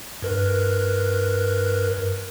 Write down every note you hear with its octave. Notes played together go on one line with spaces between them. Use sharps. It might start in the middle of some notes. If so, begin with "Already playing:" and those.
G2 A#4 B4